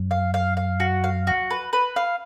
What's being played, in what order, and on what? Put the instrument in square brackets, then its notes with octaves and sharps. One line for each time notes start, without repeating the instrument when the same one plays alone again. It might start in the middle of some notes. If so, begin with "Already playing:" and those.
Already playing: [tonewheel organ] F#2
[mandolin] F5
F5
F5
F#4
F5
F#4
B4
B4
F5